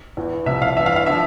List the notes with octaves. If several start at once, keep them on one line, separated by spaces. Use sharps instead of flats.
E2 E3
C2 C3 F3 E5
F5
G2 E3 E5
F5
F5
D3 F3 E5